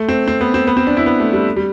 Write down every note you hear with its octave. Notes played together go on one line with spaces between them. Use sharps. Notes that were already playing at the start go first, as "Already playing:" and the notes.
Already playing: A3
C4
C4
B3
C4
B3
C4
D4
E4
B3
A3
G3
G3